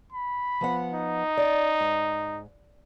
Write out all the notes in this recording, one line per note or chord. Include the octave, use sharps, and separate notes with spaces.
B5
F3 B3 F#5
D#4
D5
G#2